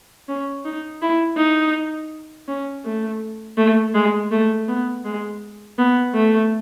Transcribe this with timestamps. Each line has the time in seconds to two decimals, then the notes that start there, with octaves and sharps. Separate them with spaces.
0.29 C#4
0.65 D#4
1.02 E4
1.37 D#4
2.48 C#4
2.85 A3
3.57 A3
3.94 G#3
4.31 A3
4.68 B3
5.05 G#3
5.78 B3
6.15 A3